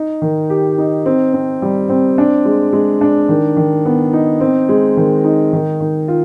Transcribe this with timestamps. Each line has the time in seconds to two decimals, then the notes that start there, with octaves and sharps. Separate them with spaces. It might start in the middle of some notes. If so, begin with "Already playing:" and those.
Already playing: D#4
0.22 D#3
0.50 G4
0.78 D#4
1.06 C4
1.34 C4
1.62 G3
1.89 C4
2.18 D4
2.45 G#3
2.73 G#3
3.01 D4
3.29 D#3
3.57 D#3
3.85 B3
4.13 D#4
4.40 C4
4.69 G#3
4.97 D#3
5.24 D#4
5.53 D#3
5.81 D#3
6.08 F4